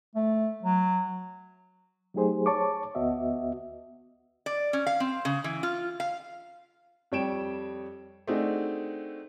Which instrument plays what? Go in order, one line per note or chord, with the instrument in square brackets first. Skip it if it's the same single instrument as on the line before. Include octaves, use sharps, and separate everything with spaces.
[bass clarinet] A3
F#3
[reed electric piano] F#3 A3 D#4 G4 G#4 C5
C#5 A5 C#6 D6
D2 B3 F#4 D#5 E5
[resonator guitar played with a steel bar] D5
C#4
F5
C4
C#3
E3
F4
F5
[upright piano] F2 G3 C#5 G5 D7 E7
A3 C4 D4 D#4 F#4 G#4